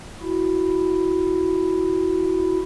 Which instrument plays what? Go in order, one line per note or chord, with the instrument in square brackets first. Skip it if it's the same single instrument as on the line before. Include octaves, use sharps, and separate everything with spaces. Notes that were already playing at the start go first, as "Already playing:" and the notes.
[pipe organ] E4 F#4